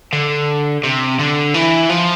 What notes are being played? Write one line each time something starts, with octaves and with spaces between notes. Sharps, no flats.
D3
C3
D3
E3
F3